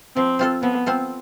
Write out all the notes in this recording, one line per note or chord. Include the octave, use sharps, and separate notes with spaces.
F3 C4
C4 F4 A4
F3 B3
C4 F4 A4